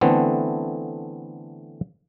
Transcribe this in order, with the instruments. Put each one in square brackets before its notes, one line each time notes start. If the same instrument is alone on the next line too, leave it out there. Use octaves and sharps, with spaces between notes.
[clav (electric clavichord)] D3 E3 A3 B3 C4